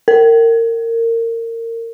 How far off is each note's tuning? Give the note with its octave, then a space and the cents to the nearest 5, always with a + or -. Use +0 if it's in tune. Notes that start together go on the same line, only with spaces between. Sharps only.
A#4 -25